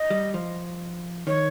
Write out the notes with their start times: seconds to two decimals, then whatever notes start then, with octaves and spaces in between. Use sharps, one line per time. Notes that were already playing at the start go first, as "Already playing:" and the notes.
Already playing: D#5
0.10 G3
0.34 F3
1.27 D#3 C#5